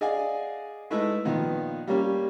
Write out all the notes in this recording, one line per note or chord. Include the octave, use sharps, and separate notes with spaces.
G#4 D5 D#5 F5 F#5 G#5
G#3 A3 D#4 E4 B4
A#2 D#3 F3 B3
G3 A#3 C#4 G4